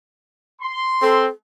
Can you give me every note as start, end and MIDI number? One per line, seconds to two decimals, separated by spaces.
0.62 1.25 84
1.02 1.28 60
1.02 1.26 69